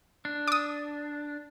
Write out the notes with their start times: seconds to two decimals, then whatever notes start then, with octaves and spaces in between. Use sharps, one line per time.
0.25 D4
0.48 D6 D#6